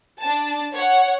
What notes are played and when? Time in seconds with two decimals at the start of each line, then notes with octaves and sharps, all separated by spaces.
0.20 D4 A5
0.73 C#5 F#5